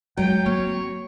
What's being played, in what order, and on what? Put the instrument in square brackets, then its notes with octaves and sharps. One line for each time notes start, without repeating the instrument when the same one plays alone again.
[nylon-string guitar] F#3 [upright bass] G#3 [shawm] G5
[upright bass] A#3 C4 [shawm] C#5